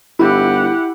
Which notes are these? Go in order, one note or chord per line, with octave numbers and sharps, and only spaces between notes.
G1 E4 G4 F#5